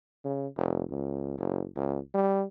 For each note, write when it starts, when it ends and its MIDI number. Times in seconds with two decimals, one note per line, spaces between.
0.24 0.47 49
0.57 0.83 29
0.90 1.36 37
1.38 1.66 30
1.76 1.99 37
2.14 2.45 55